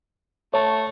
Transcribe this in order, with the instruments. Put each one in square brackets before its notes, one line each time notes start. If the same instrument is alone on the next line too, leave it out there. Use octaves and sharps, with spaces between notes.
[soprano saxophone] A3 [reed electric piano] C#5 A5